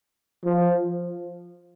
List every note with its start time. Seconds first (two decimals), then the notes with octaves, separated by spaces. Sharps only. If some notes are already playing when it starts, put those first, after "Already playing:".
0.45 F3